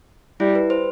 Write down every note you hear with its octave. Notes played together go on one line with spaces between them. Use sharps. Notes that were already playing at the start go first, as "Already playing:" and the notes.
G3 E4
B4
C5